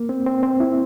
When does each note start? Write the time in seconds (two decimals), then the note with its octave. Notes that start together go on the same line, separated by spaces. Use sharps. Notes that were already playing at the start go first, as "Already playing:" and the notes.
Already playing: A#3
0.09 C4
0.26 C4
0.43 C4
0.60 E4